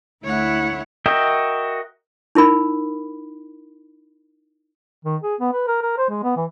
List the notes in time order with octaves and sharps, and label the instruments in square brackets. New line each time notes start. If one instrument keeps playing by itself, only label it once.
[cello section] D2 A3 E4 [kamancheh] C#5 F#5
[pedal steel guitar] F#4 A#4 D#5 E5 G5
[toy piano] D#4 E4 A#4 B5
[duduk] D#3
G#4
B3
B4
A#4
A#4
C5
G#3
B3
E3